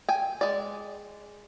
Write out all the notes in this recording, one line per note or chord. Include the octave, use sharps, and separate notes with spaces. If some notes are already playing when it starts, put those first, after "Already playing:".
G5 G#5
G#3 D5